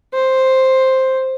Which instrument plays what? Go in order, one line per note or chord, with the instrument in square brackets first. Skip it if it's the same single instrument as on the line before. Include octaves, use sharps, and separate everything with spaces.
[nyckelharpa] C5